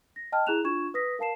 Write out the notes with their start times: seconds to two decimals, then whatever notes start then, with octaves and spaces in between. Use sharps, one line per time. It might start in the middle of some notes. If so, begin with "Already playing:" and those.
0.16 A#6
0.32 D#5 G5 A5 F6
0.47 E4 G#4 A#5 F#6 E7 F7
0.64 D4 F4 C#6 G#6 E7
0.94 B4 D#6 A#6 B6
1.19 A#4 F5 A5 C7 E7